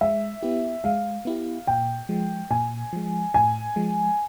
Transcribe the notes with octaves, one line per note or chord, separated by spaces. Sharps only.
G#3 E5
B3 E4 G4
G#3 F5
B3 E4 G4
A#2 G5
F3 G#3
A#2 G#5
F3 G#3
A2 G#5
F3 G#3